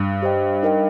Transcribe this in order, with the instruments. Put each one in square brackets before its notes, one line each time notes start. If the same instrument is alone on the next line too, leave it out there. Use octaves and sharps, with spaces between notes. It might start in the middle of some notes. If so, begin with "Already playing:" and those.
Already playing: [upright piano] G2
[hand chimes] G4 C5 D#5 G5
D#4 A#4 D#5 G5